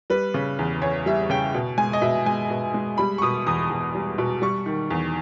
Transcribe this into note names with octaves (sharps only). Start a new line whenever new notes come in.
G3 B4
C#3
E2
E2 C#5
G3 E5
C#3 G5
B2
G#3 G#5
D#5
B2 E5
G#3 G#5
B2
G#3
G3 B5
C#6
B2 D#6
E2 D#6
E2
G3
B2
G3 C#6
D#3
E2